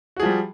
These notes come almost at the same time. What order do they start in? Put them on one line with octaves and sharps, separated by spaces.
F#4 G#4 F3 G3